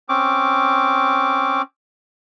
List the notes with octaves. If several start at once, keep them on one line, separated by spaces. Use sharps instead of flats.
C4 C#4 D6